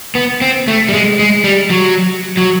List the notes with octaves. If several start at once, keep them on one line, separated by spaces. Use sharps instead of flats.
B3
C4
A3
G3
G#3
G#3
G3
F#3
F#3